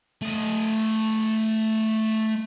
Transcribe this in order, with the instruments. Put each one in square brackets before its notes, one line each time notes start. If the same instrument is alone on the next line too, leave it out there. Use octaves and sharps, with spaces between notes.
[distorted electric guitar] A3 D#5